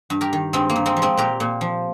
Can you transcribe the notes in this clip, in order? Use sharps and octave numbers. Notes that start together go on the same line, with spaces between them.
G2
G4 A#4
D#3
G2 G#3 C4
A#3
G2
G#3 C4
F3
G#3 C4
A#2 G4 A#4
A#2
F3